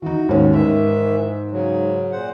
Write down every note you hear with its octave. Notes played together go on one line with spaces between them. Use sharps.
E3 D#4 F#4
D#2 G#2 C#4
G#2 D#3 E3 E5
C#3 F#3
A#2 C5 F#5